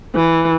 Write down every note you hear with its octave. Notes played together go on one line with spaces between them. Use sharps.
E3